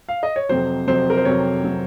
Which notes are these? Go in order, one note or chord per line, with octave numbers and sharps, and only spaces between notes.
F5
D#5
C#5
F2 C3 F#3 C5
F2 C3 F#3 C5
A#4
C5
F2 C3 F#3 C#5
C3 F#3